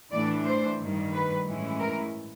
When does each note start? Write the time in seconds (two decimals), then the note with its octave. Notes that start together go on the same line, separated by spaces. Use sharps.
0.11 A2 E3 A3 D4 D5
0.45 C5
0.79 G2 D#3 G3
1.12 B4
1.46 A2 E3 G#3 C#4 E4
1.80 A#4